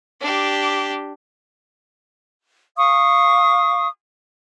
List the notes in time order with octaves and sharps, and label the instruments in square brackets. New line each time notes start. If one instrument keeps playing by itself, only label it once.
[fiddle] D4 G4
[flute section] F5 C#6 D#6